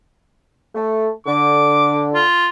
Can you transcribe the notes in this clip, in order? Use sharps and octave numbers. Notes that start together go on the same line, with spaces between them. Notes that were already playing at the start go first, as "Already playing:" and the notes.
A3
D3 D6
F4